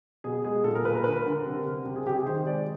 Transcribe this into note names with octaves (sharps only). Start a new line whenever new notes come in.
B2 G#4
G#3 G#4
A#2 A4
A#4
A#2 B4
A#4
D3 B4
A#4
D3
C3
C3
C3
G#4
C3 G4
G#4
D#3 C5
G#3 D5